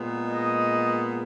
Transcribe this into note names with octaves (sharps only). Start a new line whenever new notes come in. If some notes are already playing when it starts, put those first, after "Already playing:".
Already playing: A#2 G#3 B3
D#5